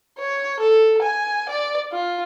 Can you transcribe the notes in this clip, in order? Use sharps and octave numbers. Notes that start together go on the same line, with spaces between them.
C#5
A4
G#5
D5
F4